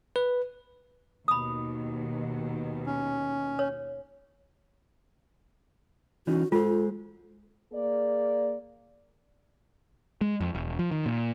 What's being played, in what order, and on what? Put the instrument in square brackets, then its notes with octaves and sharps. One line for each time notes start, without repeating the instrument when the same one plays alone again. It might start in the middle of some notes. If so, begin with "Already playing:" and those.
[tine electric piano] B4
[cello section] D#2 B2 D#3 [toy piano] B5 D#6
[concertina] C#4
[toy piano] C#5
[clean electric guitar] E3 C#4 D#4 [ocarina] F#4
[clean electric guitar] G#3 C5 [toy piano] F4 [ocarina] A4
[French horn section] A#3 G#4 D5
[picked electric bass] G#3
F2
E1
F3
D#3
A#2